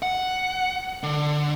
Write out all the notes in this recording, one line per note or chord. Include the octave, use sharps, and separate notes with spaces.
F#5
D3